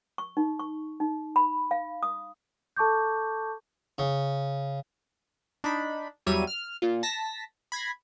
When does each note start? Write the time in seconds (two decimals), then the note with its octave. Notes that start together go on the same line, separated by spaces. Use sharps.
0.18 C#6
0.37 D#4
0.59 C#6
1.00 D#4
1.36 B5
1.71 F5
2.03 D#6
2.76 A4 A5 C#6 D6 G6
3.98 C#3
5.64 D4 D#4 B5
6.26 E2 F#3 G3 C#5 E5 D#7
6.47 F6
6.82 A#2 F4
7.03 A5 A#6 B6
7.72 B5 G#6 A#6 C7